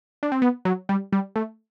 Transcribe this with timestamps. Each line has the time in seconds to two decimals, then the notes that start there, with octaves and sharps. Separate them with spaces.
0.23 D4
0.32 C4
0.42 B3
0.65 F#3
0.89 G3
1.13 G3
1.36 A3